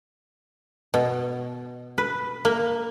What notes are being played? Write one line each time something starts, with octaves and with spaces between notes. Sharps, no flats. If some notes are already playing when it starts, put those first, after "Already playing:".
B2
B4
A#3